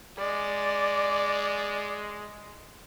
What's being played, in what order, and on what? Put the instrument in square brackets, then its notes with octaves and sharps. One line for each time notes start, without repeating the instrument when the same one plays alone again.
[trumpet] G#3 [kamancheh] D5